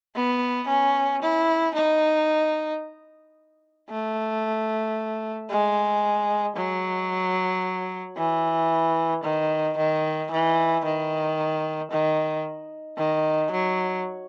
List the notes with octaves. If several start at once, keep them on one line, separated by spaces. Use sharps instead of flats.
B3
C#4
E4
D#4
A3
G#3
F#3
E3
D#3
D#3
E3
D#3
D#3
D#3
F#3